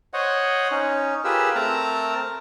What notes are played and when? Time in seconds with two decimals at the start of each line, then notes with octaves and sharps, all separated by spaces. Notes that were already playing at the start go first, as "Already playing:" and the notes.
0.13 C5 C#5 D#5 F#5
0.71 C#4 D#4
1.24 F4 G4 G#4 A#4 B4 E6
1.55 A3 C4 A#4 A5 A#5